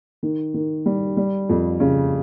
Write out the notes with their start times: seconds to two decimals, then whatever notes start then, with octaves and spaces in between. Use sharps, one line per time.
0.23 D#3
0.54 D#3
0.86 G3
1.17 G3
1.49 F2
1.80 C#3